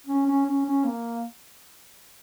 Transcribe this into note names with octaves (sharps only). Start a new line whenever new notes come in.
C#4
C#4
C#4
C#4
A#3